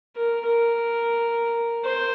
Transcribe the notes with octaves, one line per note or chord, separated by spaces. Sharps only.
A#4
A#4
C5